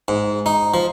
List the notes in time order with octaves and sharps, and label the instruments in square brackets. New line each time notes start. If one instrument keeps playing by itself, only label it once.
[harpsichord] G#2
D#4
F3